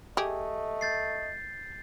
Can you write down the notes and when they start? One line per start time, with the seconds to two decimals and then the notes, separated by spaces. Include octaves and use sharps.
0.17 A3 G4 G#4 D#5
0.81 G6 A6 C7